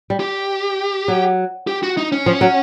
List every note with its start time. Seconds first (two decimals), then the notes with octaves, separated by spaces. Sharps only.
0.10 G3
0.20 G4
1.08 F#3
1.67 G4
1.83 F#4
1.97 D#4
2.12 C#4
2.26 F3
2.41 F#3